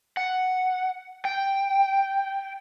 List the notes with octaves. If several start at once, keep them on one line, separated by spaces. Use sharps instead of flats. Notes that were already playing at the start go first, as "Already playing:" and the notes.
F#5
G5